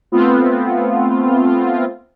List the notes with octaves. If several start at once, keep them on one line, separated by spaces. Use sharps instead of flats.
A3 B3 C4 F4